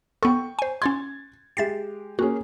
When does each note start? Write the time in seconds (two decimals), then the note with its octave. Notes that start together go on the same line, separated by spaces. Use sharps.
0.23 B3 A4 G5 C#6
0.59 C5 G#5
0.82 C#4 C6 G#6 A6
1.57 G#3 G4 E5 A6 C7
2.19 A#3 C#4 F#4 G#4